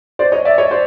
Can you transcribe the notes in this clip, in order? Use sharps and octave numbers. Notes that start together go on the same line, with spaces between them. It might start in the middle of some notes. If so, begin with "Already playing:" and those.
C5 D5
C#5 D#5
D5 E5
C#5 D#5
C5 D5